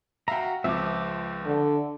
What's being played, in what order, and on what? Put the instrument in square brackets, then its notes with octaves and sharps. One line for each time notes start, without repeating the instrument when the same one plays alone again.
[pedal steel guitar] F#4 A#5 [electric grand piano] E5 F5 G5
[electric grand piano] C#2 F3 C4 [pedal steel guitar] E5 D6
[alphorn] D3